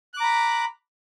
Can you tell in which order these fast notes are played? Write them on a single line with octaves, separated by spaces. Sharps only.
F#6 D6 A#5 B5